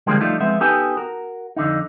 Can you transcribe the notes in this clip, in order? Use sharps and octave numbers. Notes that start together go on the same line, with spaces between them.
D3 F3 G3 G#3 A#3 C4
F3 G3 A3 D4 D#4 F4
F3 G#3 B3 C4 E5
B3 D#4 G4 A4 B4 G#5
F#4 A#4
F2 D3 D#4